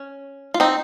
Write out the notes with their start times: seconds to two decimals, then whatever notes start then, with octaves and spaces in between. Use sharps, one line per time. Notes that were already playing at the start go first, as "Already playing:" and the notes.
Already playing: C#4
0.54 F4
0.60 C4 D#4